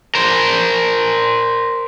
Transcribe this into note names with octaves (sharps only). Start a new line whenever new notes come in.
A#4 C5